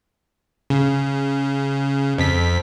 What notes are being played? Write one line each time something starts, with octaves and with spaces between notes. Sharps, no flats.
C#3
F2 B6